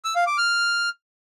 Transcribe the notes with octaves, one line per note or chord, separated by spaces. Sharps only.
E6
F5
D6
F6